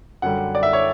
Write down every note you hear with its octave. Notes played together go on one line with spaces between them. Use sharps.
F#2 D3 G3 F#5
D5
E5
C#5